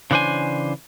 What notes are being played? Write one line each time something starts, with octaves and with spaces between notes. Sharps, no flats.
C#3 E3 D4 C5 G#5